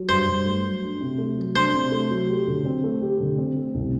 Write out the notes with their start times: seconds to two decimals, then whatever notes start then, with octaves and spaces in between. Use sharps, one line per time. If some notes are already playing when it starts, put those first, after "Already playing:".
Already playing: F#3
0.09 G2 C5
0.28 G2
0.46 A3
0.64 F#3
0.83 D4
1.01 C3
1.18 A3
1.37 F#3
1.55 D4 C5
1.73 C3
1.92 A3
2.11 F#3
2.29 G4
2.47 D3
2.65 C4
2.84 A3
3.02 G4
3.20 D3
3.38 C4
3.56 A3
3.75 C2